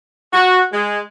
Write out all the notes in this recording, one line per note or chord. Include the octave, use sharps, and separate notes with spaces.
F#4
G#3